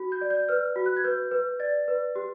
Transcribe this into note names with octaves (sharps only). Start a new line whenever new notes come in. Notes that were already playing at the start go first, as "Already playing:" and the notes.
Already playing: F#4
G6
D5
G6
B4 F6
F#4
F#6
G#6
B4 G6
B4
D5 A6
B4
G4